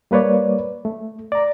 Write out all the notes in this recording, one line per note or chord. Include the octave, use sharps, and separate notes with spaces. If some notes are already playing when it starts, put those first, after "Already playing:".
G3 A#3 B4 C#5 D5
A3
D5 A#5